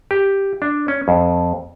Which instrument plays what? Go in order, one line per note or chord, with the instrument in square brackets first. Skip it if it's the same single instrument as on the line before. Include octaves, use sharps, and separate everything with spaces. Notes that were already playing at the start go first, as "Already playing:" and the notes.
[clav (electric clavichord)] G4
D4
C#4
F2